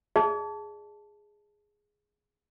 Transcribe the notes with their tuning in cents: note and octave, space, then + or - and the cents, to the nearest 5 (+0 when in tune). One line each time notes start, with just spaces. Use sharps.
G#4 +0 D5 +30 A5 +0